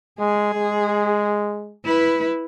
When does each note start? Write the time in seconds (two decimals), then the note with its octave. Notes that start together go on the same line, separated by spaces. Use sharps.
0.19 G#3 G#4
0.54 G#3
1.84 E4 B4